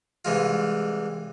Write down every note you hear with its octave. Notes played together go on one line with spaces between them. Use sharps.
C2 E3 G#3 F4